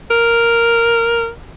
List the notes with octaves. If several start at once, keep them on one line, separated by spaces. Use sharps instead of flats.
A#4